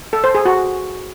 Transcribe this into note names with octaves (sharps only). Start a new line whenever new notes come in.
A4
C5
G#4
F#4